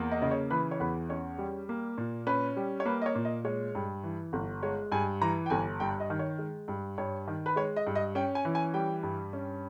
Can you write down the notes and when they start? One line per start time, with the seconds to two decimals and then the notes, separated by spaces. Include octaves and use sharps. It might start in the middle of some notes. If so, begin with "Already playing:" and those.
Already playing: E2 A#3
0.11 D#5
0.22 C#3 D#5
0.31 C#5
0.51 E3 B4
0.71 C#5
0.80 E2 B4
1.09 C#4 C#5
1.38 G3
1.69 A#3
1.98 A#2
2.27 C#4 B4
2.56 G3
2.80 C#5
2.85 A#3 B4
3.02 D#5
3.06 C#5
3.15 A#2
3.25 D#5
3.45 G#3 C#5
3.75 G2
4.04 E3
4.33 G1
4.63 G#3 C#5
4.92 G2 G#5
5.21 E3 A#5
5.46 G5
5.50 G1 G#5
5.80 G2 G5
6.00 D#5
6.10 D#3
6.19 C#5
6.39 G#3
6.68 G2
6.98 G2 C#5
7.28 D#3
7.46 B4
7.56 G#3 C#5
7.76 D#5
7.87 G2
7.95 D#5
8.15 C#4 G5
8.35 G#5
8.45 E3
8.55 G#5
8.74 G3 G5
9.03 G2
9.33 C#4